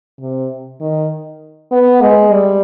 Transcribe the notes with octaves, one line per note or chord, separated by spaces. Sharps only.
C3
D#3
B3
G#3
G3